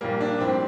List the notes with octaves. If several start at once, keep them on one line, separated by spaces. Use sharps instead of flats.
A#1 A#2 G3 A#3
D4
A#1 A2 G3 C4